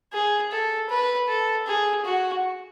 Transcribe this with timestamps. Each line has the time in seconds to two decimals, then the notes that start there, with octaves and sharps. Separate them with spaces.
0.13 G#4
0.52 A4
0.90 B4
1.29 A4
1.67 G#4
2.05 F#4